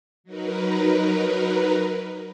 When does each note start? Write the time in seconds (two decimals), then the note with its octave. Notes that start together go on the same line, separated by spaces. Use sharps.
0.24 F#3 D#4 A#4 B4